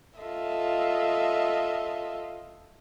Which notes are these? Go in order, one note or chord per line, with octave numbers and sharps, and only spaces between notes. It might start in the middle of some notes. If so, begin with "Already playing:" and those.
F4 A4 D#5 E5